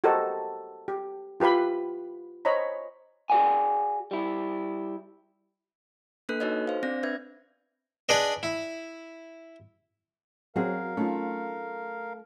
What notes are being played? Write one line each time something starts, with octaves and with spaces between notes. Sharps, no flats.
F#4 G4 A4 A#4 C5 D#5
G4
F4 G4 B4 F5 B5
C5 C#5 D#5 A#5 B5
F#4 G#4 A4 D5 F#5 G#5
G3 E4
A#3 D4 A4 B4 F#6
D#4 F#4 A4 B4 C#5 D#5
C5 F5
C4 D4 D5 A#6
D4 B4 E5 G#6
D4 G#4 B4 D5 D#5
E4
F#3 C4 F#4 G#4 A#4 F5
A3 C#4 D#4 F4